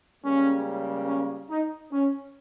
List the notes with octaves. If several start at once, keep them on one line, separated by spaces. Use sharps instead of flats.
C#2 C#3 G3 A#3 C#4
C#4
D#4
C#4